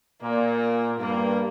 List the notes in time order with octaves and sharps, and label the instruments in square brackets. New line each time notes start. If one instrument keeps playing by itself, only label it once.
[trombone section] A#2 [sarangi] A#3
[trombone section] G2 [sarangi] A#3